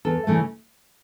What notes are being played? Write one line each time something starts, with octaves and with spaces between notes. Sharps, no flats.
E2 A4
C#3 E3 A3